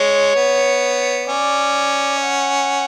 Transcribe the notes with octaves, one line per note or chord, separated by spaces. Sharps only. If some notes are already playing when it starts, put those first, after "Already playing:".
Already playing: G#3 C#5
B3
C#4 D5
F#5